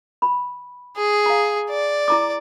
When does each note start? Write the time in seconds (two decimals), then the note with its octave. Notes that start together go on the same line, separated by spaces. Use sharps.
0.22 B5
0.97 G#4
1.26 F5 A#5
1.70 D5
2.08 E4 A#5 D6